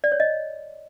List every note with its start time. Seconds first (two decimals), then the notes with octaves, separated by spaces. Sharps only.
0.04 D5
0.12 C#5
0.20 D#5